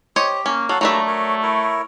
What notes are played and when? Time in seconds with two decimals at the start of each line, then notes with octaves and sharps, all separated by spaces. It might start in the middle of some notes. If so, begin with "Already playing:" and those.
0.16 G4 C5 C#5 D#5
0.46 A#3 C#4
0.69 F#3 F#4 A4 F5
0.81 F#3 G3 A3 A#3 D4 E5 A#5
1.07 A#4 C#5
1.42 E4 A#4 C#5